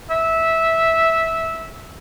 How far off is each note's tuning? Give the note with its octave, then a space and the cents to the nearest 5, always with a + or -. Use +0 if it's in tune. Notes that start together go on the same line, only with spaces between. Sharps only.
E5 -15